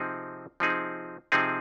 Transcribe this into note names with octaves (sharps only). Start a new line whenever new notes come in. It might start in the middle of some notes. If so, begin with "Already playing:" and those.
Already playing: C3 F3 C4 D#4 G#4
C3 F3 C4 D#4 G#4
C3 F3 C4 D#4 G#4